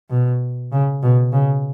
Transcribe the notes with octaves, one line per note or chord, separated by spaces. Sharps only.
B2
C#3
B2
C#3